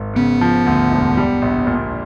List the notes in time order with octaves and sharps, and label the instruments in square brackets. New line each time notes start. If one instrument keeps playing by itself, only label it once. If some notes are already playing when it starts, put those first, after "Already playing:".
Already playing: [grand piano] G#1
[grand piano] C#3 [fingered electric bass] B3
[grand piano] F3
D2
E1
G3
A#1
A#2